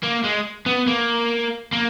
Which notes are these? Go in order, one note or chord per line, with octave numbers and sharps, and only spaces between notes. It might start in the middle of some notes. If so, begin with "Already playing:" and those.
A#3
G#3
B3
A#3
A#3